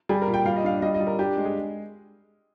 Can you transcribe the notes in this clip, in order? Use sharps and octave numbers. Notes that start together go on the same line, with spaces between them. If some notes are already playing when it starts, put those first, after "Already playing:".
G3 G#4
A#4
A#2
G5
G3 F5
D#5
D4 F5
G3 D#5
D#5
G3
A#4
D4 G4
G#3
G#4